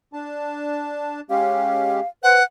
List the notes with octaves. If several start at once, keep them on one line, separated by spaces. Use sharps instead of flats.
D4 A5
G#3 C#4 G4 F5
B4 C5 F#5